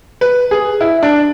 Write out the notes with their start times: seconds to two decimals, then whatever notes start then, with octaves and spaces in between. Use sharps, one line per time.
0.21 B4
0.51 G#4
0.81 E4
1.03 D4